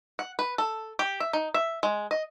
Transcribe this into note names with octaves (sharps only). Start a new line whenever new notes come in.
F#5
B4
A4
G4
E5
D#4
E5
G#3
D#5